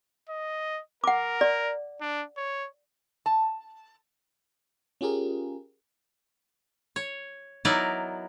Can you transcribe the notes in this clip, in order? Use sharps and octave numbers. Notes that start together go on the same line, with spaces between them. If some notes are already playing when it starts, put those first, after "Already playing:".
D#5
A#4 F#5 D6
D5
D4
C#5
A5
C#4 F4 G4 G#4 A#4
C#5
F#3 B3 D#4 E4 A#4 D5